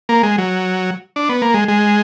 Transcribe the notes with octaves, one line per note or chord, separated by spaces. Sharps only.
A#3
G#3
F#3
D4
B3
A#3
G#3
G#3